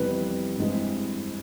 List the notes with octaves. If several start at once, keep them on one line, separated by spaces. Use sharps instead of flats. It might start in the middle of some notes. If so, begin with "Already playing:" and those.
Already playing: F2 C3 E3 G3 B3 B4
G2 E3 G#3 C4